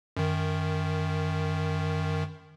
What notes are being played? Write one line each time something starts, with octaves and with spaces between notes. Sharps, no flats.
F#2 D#3